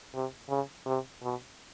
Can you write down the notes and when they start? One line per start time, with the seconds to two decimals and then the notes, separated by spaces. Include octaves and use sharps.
0.14 C3
0.49 C#3
0.86 C3
1.23 B2